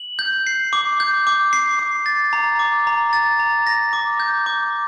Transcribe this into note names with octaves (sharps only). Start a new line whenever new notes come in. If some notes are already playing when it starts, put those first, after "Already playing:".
Already playing: F#7
G6
C7
D6
G6
D6
C7
D6
A6
A#5
D6
A#5
A6
A#5
A#6
D6
G6
D6